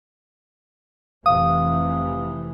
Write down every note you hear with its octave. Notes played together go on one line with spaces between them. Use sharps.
F1 C3 E3 F5 D#6